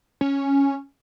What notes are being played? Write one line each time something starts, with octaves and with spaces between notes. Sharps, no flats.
C#4